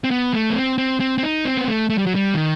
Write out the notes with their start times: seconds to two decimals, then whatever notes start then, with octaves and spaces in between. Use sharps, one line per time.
0.04 C4
0.11 B3
0.33 A3
0.50 B3
0.56 C4
0.78 C4
1.00 C4
1.18 C4
1.23 D#4
1.45 C4
1.57 B3
1.68 A3
1.90 A3
1.98 G3
2.06 F#3
2.15 G3
2.35 D#3